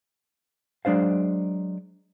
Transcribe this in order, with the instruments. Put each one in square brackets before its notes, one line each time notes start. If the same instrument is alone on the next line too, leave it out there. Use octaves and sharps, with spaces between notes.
[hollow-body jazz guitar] F#3 G#3 D4 C5 F5